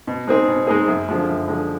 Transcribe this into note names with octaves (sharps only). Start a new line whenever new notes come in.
B2
G#3 C4 D#4 G#4
B2
G#3 C4 D#4 G#4
F#2
D3 F3 G#3
F#2
D3 F3 G#3